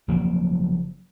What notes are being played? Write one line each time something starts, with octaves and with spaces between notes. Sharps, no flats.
F#1 F3 F#3 A#3